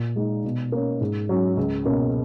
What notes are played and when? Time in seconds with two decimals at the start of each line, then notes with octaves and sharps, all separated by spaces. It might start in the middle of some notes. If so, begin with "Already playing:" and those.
Already playing: A#2
0.16 G#3 D#4
0.44 B2
0.72 A#3 C#4
1.01 G#2
1.29 F#3 C#4
1.57 C#2
1.85 B2 A#3 C#4